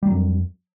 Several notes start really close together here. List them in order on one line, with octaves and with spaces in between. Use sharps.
G3 F#3 F2